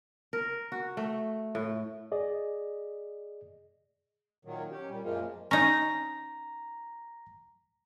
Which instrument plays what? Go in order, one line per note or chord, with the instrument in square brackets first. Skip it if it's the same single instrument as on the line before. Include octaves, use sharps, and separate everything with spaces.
[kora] A#4
F#4
A3
A2
[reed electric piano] G#4 D5 D#5
[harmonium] A#2 D#3 F#3
C#4 G4
A#2 G3
F#2 A#2 F3 G#3 A#3 F4
[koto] C#4 D#4 [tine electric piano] A#5 A#6